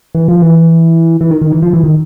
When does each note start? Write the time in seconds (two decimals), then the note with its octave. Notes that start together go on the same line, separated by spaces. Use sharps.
0.15 E3
0.28 F3
0.42 E3
1.21 E3
1.31 D#3
1.41 D#3
1.52 E3
1.62 F3
1.73 E3
1.84 D#3